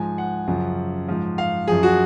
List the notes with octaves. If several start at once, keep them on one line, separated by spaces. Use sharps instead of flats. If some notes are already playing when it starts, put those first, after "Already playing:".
Already playing: G#2 F3 G#5
F#5
F#2 C#3 F3
G#2 F3
F5
F#2 F3 G#4
F#4